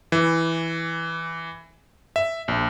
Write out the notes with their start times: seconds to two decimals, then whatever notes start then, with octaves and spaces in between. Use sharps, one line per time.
0.12 E3
2.16 E5
2.48 A#1